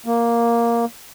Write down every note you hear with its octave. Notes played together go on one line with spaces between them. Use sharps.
A#3